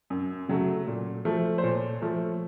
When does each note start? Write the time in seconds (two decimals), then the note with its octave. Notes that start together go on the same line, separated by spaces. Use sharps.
0.10 F#2
0.48 C#3 F#3 A3
0.87 A#2
1.25 F3 A3
1.58 C5
1.63 A#2 C#5
2.02 F3 A3